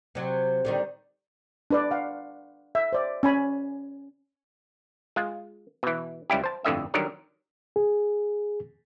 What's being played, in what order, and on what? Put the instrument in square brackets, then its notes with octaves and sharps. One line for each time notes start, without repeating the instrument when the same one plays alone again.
[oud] C3 F#3
D3 D#3 G3
[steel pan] D4 B4 D5
F5 F#5
E5
C5 D5
C#4 G#5 B5
[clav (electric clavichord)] G#3 F4
B2 E3
C#2 G3 E4 G4
C5 A5
G1 F2 A2 D3 D#5 E5
D3 D#3 F#3 G3 A#4
[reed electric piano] G#4